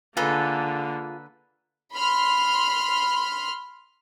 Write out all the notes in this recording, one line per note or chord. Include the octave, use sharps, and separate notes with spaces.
D3 A#3 D#4 F4 G#4 A4 B4
B5 C6 F6